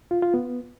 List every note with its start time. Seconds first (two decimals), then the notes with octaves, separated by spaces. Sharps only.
0.11 F4
0.22 F4
0.34 B3